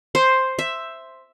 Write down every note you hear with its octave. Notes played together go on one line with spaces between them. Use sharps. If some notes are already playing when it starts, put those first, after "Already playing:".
C5
E5